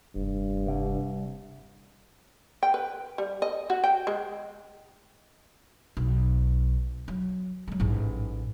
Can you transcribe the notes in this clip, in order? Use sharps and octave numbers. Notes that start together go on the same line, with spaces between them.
F1 G2
C2
G5
B4
G3
D#5
F#4
G5
G#3
B1
F#3
F#3 G#3
A1 G#2